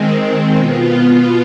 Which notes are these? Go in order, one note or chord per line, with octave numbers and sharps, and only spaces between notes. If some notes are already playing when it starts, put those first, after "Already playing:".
Already playing: D#3 G#3 C4
B2 B3 F4